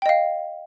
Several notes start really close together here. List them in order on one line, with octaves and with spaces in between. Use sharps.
G5 D#5 F5